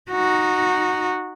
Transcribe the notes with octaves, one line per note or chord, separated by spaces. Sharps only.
D#4 F#4